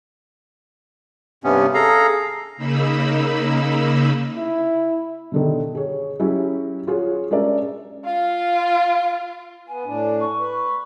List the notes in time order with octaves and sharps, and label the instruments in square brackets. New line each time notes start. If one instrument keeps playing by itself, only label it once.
[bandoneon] G2 C3 B3 C#4
G#4 A4 F5 A#5
[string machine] C#3 A#3 D#4 B5 E6
[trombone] E4
[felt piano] B2 D3 D#3
G#4 C#5
F#3 C#4 E4 G4 G#4
F4 F#4 G#4 C#5
G#3 C#4 D4 A#4 D5 E5
[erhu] F4 [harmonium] F5
[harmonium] B3 [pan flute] G#5
[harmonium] A2 D4
[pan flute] C#6
[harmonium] B4